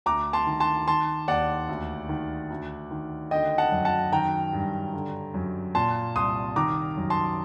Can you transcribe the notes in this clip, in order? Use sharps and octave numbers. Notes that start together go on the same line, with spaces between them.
D2 A#5 D6
A5 C6
D#3
A5 C6
D#3 A5 C6
D#2 D5 F#5
D2
D#3
D2
D#3
D3 D#5 G5
F#5 A5
F#2
F#5 A5
D#3 G5 A#5
G2
D3
F#2
A#2 A5 C6
C2 C6 D#6
D#3 A#5 D6
F#2
A5 C6